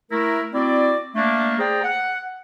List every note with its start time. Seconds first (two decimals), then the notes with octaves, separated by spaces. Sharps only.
0.10 A3 E4 A#4
0.54 C4 E4 F#4 D5
1.15 A3 A#3 D4
1.59 G#4 C5 D5 G5 A#5
1.84 F#5